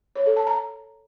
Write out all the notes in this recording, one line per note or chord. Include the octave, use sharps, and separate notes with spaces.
C#5
A4
A5
A#5